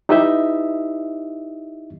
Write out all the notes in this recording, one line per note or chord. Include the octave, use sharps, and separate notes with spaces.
D#4 E4 G4 B4 D#5 E5